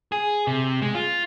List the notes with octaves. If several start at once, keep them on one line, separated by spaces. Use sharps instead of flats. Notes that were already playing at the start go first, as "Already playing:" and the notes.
G#4
C3
G#3
F4